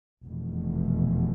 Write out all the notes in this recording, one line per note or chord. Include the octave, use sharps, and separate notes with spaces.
F1 E2 B2